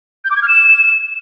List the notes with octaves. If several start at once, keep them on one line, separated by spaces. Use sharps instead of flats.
G6
D6
G#6
F6
E7